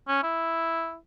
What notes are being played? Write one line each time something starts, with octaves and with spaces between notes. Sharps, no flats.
C#4
E4